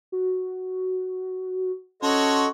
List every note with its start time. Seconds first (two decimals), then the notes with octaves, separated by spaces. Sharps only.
0.12 F#4
2.03 C#4 F#4 A4 C#5 D#5 A5 C6